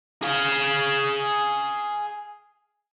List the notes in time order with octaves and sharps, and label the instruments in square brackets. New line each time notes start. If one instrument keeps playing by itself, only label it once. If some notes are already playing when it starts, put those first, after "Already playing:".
[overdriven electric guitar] G#4 F5